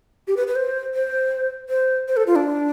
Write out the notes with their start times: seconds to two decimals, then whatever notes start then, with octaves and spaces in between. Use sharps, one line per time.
0.28 G4
0.37 B4
0.47 B4
0.56 C5
0.94 C5
1.69 C5
2.08 C5
2.17 A4
2.27 F4
2.36 D4